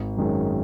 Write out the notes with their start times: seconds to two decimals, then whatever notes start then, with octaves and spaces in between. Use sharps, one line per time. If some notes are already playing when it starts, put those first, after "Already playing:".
Already playing: G#1
0.17 F#2 D#3 G#3 C#4